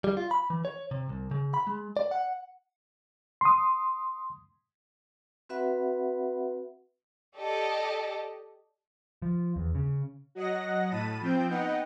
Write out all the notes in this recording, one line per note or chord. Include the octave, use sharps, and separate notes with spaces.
G3
F4
B5
E3
C#5
C3
C2
C#3
B5
G#3
D5
F#5
C6 D#6
C4 F#4 B4 E5 F#5 B5
G4 A4 D5 D#5
F3
E2
C#3
F#3 D#5 F#5 A#6
A2 A5 B5 D#7
F3 C4 G5 G6
B3 D#4 D#5 F#5 G5